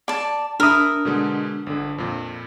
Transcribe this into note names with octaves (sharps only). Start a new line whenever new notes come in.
D5 A5
D4 A#4 E5 B5 D#6 E6
B2 D3 G#3
G1 D3
F2 A#2